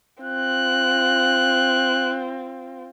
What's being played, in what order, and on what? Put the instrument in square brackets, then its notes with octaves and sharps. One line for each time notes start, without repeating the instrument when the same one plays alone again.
[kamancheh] C4 F4 [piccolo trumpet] F#6